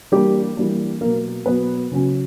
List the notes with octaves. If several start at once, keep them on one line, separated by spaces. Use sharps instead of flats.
E3 G3 A#3 D4 G4
E3 G3 A#3 D4
B2 F#3 A#3 B3 A#4
B2 F#3 B3 B4
C#3 F#3 C#4